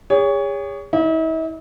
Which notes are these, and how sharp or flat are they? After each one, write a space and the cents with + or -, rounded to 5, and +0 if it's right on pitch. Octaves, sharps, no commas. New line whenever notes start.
G#4 -40 C#5 +20
E4 -45 D5 +25